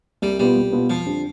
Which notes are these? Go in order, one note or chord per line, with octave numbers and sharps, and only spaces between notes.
C2 G3
B2 G3 B3 F4
C2
B2 B3 F4
F2 F3
D3 G3 C4